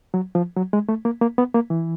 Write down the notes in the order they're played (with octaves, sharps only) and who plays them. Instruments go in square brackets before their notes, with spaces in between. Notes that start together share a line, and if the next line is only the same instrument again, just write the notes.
[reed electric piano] F#3
F3
F#3
G#3
A3
A#3
A#3
B3
A#3
E3